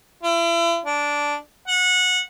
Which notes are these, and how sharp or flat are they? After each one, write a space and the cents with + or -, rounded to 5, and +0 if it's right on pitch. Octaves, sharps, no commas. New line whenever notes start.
E4 +40
D4 -10
F#5 -20